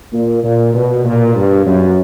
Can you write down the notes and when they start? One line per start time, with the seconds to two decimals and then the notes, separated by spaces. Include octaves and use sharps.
0.13 A#2
0.43 A#2
0.74 B2
1.04 A#2
1.35 G2
1.66 F#2